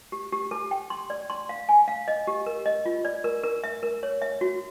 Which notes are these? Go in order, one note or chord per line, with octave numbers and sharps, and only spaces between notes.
G4
G4
A4
G5
C6
D5
C6
F5
G#5
F5
D#5
G4
A#4
D#5
F4
D5
A#4
A#4
E5
A#4
C#5
E5
F#4